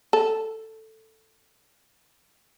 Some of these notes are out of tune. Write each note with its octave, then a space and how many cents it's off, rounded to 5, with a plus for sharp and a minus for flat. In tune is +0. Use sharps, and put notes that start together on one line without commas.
A4 +5